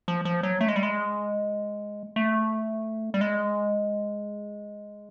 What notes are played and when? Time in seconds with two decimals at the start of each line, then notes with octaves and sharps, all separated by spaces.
0.08 F3
0.25 F3
0.43 F#3
0.61 A3
0.68 G#3
0.76 G3
0.83 G#3
2.16 A3
3.14 G3
3.21 G#3